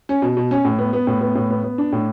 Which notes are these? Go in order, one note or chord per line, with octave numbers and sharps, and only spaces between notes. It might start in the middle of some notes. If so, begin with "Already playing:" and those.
C#4
B2
B2
C#4
A2
B3
B3
A2
B3
A2
B3
B3
D4
A2